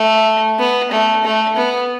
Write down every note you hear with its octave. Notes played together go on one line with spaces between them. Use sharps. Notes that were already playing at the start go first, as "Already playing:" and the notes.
Already playing: A3
B3
A3
A3
B3